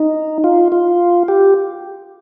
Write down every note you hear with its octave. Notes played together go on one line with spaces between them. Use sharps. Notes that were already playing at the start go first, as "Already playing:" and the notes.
Already playing: D#4
F4
F4
G4